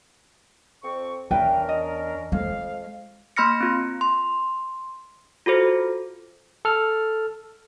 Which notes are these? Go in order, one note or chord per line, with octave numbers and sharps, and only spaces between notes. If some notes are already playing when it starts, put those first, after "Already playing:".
F2 C4 C#6
E2 C#4 D4 A#4 B4 E5 G5
D#5
F2 G#3 F5
A#3 B5 C6 F6 A#6 C#7
C4 F4
C6
F4 F#4 A4 C5
A4 F6